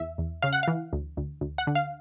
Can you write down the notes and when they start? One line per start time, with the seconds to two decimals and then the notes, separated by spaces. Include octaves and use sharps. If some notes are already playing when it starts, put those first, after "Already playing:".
Already playing: E2 E5
0.18 E2
0.42 C#3 F5
0.53 F#5
0.63 E3 F5
0.93 D2
1.17 D2
1.41 D2
1.58 F#5
1.67 D3
1.75 F5